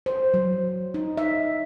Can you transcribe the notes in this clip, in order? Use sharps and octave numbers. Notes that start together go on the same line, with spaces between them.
C5
F#3
D#4
E5